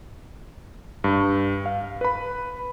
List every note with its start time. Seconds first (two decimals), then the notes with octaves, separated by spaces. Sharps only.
1.04 G2
1.66 F5
2.01 B4 B5